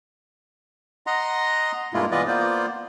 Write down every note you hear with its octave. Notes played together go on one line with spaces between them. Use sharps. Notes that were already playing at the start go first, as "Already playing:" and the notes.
D#5 F#5 A#5 C6
G2 B2 G#3 A#3 E4 F4
E3 B3 F4 B4 D5 D#5
A#3 B3 F4 C5 D5